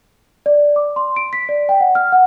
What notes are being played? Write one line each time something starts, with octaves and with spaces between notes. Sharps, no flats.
D5
D6
C6
D7
B6
D5
G5
F#5
F6
F#5